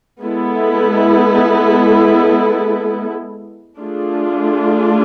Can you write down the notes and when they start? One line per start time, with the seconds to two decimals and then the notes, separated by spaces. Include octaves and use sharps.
0.22 G#3 B3 E4 A4
3.79 A3 D4 F4 G#4